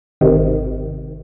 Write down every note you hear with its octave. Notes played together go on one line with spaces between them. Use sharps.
G#1 C3 D#3